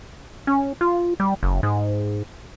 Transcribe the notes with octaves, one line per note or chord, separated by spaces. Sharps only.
C#4
F4
G3
F#1
G#2